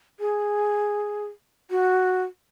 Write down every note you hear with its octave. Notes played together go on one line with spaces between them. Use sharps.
G#4
F#4